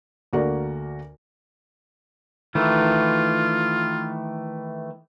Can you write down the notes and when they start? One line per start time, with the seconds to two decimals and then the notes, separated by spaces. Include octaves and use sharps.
0.33 D2 A#3 F#4 A4 A#4 D5
2.55 D#3 E3 A3 F4